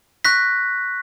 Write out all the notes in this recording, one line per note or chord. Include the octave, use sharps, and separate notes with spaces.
C#6 F#6 A#6 B6